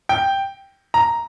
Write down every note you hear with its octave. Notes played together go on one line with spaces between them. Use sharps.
G5
A#5